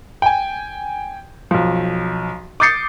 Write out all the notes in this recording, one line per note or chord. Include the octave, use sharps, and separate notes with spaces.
G5 G#5
B1 F3
D6 D#6 G6 A6 C7 C#7